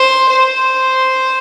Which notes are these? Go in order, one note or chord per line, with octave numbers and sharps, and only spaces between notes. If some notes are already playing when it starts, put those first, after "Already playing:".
Already playing: C5
C5